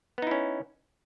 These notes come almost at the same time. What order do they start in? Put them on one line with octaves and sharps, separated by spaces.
B3 D#4 E4 C#4